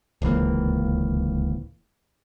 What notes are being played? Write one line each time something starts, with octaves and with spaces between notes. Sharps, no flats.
D1 C#2 E3 A#3